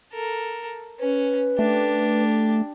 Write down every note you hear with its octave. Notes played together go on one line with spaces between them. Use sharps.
A4 A#4
C#4 B4
A3 D4 G4